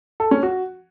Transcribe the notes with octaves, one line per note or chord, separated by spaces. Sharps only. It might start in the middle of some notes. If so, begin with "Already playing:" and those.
A4
C#4
F#4